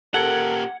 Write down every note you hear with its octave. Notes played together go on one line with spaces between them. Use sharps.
A#2 G4 A4 A#4 F#5 G#6 C#7